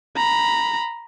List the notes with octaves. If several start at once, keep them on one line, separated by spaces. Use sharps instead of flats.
A#5 B5